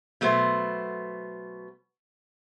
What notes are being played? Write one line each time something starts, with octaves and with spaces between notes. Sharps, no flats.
B2 F#3 A3 B3 C5